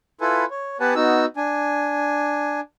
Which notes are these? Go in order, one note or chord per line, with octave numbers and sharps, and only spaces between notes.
E4 F4 A4 B4 G#5
C#5
B3 G4 B4 F#5 G#5 A5
B3 D#4 F#4 E6
D4 G#5